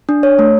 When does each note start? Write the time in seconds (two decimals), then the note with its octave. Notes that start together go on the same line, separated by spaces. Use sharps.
0.09 D4
0.23 C#5
0.39 A3